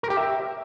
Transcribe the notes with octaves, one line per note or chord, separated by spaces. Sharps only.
A#4
G4
E5